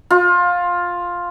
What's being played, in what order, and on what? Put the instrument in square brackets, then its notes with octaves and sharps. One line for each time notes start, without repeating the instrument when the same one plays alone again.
[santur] F4